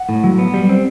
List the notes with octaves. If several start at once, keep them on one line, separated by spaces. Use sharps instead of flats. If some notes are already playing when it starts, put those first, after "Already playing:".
Already playing: F#5
A2
F#3
B3
G3
C4